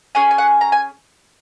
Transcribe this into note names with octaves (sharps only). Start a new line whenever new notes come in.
C#4 G#4 G#5
G#5
F#5
A#5
G#5